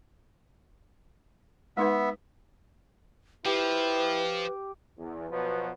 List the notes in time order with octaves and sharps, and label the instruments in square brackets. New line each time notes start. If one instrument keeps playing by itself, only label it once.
[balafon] G#3 D#4 B4 [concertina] B3 E5
[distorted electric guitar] F3 [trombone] E4 [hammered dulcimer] G4 [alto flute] B4
[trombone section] E2
B2 F3 F#3 B3